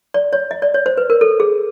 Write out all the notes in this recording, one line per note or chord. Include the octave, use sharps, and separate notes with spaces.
D5
C#5
D#5
D5
C#5
C5
B4
A#4
A4
G#4